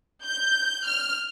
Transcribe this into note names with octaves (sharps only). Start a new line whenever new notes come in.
G6
F6